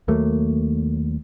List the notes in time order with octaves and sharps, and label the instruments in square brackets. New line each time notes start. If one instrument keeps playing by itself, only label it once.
[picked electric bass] D#2 F#3 A3 A#3